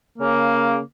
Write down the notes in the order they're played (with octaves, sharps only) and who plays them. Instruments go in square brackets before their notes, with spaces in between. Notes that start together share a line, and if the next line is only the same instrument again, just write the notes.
[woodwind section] C#3 A#3